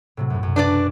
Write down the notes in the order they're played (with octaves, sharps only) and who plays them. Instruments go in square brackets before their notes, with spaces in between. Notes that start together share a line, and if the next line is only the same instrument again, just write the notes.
[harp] A2 C3 F#3
B1 F#2
F#2
[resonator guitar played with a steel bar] D4 B4 D5